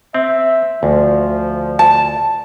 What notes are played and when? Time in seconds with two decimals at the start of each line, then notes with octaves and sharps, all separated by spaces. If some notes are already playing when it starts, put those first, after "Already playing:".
0.14 C4 E5
0.83 D2 F3
1.79 A5